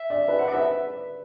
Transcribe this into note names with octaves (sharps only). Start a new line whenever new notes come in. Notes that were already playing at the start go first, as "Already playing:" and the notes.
Already playing: E5
D5
B4
C5 F#5
D5
B4 E5